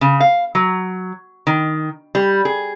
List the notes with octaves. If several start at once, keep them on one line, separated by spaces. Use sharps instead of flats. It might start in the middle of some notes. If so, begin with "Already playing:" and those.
C#3
F5
F#3
D#3
G3
G#4